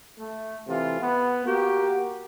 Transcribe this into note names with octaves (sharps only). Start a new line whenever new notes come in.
A3
C3 E3 A3 F4
B3
A#3 F#4 G4